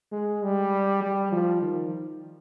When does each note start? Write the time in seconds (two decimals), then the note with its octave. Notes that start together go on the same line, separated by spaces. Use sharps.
0.12 G#3
0.43 G3
1.03 G3
1.32 F3
1.62 D#3